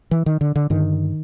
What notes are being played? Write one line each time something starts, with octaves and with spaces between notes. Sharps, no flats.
E3
D#3
D3
D3
G2 D3 D#3